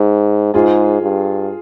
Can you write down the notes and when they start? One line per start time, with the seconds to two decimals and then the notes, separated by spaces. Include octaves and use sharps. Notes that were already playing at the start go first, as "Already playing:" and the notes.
Already playing: G#2
0.54 G#2 F4 G#4
1.02 G2